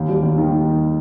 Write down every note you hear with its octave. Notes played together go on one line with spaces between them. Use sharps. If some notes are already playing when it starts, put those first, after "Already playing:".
Already playing: D#2
G3
D#2
D#3